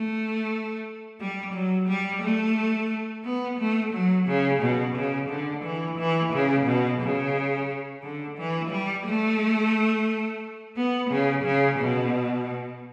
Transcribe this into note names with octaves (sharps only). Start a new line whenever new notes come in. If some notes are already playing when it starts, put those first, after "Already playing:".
Already playing: A3
G3
F#3
G3
A3
B3
A3
F#3
C#3
B2
C#3
D3
E3
E3
C#3
B2
C#3
D3
E3
G3
A3
B3
C#3
C#3
B2